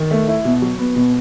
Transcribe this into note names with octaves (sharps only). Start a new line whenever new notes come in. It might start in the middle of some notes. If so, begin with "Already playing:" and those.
Already playing: D#3
A3
E4
B2
F#3
B3
B2